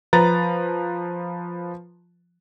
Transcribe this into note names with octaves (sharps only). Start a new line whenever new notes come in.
F3 B4 A#5 A6